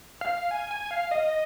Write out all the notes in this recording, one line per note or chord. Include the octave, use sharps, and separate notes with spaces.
F5
G#5
G#5
F5
D#5